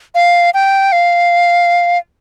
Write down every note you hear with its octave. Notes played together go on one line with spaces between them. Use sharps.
F5
G5
F5